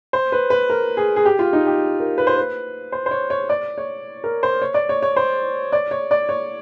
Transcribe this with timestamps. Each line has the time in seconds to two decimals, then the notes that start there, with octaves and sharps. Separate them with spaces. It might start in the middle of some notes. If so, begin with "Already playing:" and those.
0.13 C5
0.32 B4
0.50 B4
0.70 A#4
0.97 G#4
1.16 G#4
1.25 G4
1.39 F4
1.53 D#4
1.66 G4
2.00 A#4
2.18 B4
2.27 C5
2.37 B4
2.92 C5
3.06 C5
3.11 C#5
3.30 C#5
3.49 D5
3.78 C#5
4.24 A#4
4.43 C5
4.62 C#5
4.74 D5
4.89 C#5
5.02 C#5
5.16 C5
5.72 D5
5.91 C#5
6.11 D5
6.29 C#5